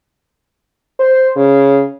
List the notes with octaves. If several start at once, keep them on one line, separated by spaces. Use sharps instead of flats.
C5
C#3